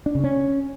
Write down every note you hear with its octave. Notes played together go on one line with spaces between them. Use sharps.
D4
C#3
C#4